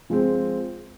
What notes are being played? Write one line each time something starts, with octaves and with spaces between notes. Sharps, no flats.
F3 G#3 C4